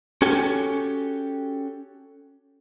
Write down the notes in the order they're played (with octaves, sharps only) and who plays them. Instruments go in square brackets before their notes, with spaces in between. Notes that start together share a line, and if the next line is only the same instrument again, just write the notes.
[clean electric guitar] C#4 F#4 G4 A4 G#5